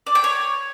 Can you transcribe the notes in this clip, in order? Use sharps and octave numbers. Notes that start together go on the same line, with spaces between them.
D5
G5
C#5